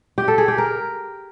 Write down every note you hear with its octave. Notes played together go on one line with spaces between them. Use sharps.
G4
A4
G#4
G4
A#4